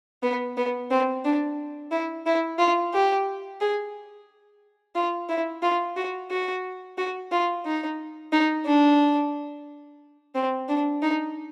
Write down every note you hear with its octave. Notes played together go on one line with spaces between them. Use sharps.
B3
B3
C4
D4
E4
E4
F4
G4
G#4
F4
E4
F4
F#4
F#4
F#4
F4
D#4
D#4
D4
C4
D4
D#4